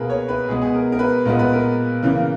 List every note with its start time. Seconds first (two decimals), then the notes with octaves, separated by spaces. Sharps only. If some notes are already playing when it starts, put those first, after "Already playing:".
Already playing: B2 A#3 G#4 A#4 B4
0.10 C#5
0.29 B4
0.48 B2 G#3 B3 G#4
0.62 G#4
0.74 A#4
0.92 A#4
0.99 B4
1.25 A#2 G#3 B3 A#4
1.39 B4
1.53 A#4
2.03 C#3 E3 A#3